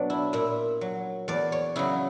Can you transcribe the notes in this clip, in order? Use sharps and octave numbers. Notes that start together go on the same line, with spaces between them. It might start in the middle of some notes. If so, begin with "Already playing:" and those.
Already playing: B2 F#3 B3 D4
E4
A#2 E4
F#3
E2 D5
C#5
C#3 F#3 E4